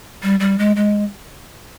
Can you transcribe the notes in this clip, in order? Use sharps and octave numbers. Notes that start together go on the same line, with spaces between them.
G3
G3
G#3
G#3